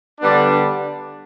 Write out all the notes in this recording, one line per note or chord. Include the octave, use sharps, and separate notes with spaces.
D3 G3 B3 D4